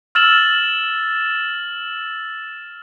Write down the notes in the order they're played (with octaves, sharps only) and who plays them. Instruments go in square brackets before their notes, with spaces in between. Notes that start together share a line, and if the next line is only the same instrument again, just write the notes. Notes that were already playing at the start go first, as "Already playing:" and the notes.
[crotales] E6 F6 A6 E7 F#7